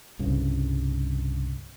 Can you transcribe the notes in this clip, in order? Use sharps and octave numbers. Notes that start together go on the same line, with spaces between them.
C2 G2 C#3